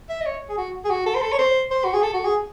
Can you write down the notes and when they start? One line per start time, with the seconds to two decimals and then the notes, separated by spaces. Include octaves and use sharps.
0.09 E5
0.21 D#5
0.26 C#5
0.49 G#4
0.57 F#4
0.85 G#4
0.90 F#4
1.06 A4
1.15 C5
1.22 A4
1.32 C#5
1.38 C5
1.71 C5
1.85 F#4
1.93 G#4
2.02 A4
2.14 F#4
2.25 G#4